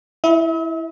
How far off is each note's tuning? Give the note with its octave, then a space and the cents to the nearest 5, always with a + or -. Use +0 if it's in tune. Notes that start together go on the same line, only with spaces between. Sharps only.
E4 +0 E5 -40